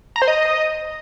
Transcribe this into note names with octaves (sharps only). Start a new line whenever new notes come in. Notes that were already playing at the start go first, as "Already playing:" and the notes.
A#5
C5
D#5